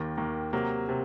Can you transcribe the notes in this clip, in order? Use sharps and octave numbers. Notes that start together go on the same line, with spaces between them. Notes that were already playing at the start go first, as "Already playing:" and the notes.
Already playing: D#2 D#3 A#3
D#2 D#3 A#3
C3 F#3 A#3
C3